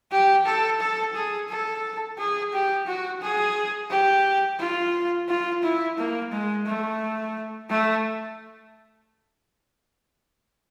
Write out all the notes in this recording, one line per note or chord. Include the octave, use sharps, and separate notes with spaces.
G4
A4
A4
G#4
A4
G#4
G4
F#4
G#4
G4
F4
F4
E4
A#3
G#3
A3
A3